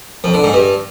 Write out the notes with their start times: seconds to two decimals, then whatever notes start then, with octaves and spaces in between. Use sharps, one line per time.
0.24 F2
0.34 D3
0.44 G#2
0.53 G2